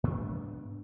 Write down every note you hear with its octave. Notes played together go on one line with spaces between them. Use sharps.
G#2 B3 D4